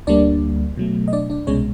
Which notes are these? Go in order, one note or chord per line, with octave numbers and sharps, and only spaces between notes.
D2 D3 G3 A#3 D4 D5
B2 F#3 A3
D#5
D4 D5
D4 D5
C2 B2 G#3 C#4 C#5